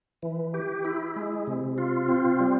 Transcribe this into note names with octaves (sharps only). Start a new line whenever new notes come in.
E3
G4
E4
G#3
C3
F4
C4
G3